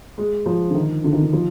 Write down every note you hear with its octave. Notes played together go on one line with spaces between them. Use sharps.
G#3
F3
D3
D#3
D3
D#3
D3
F3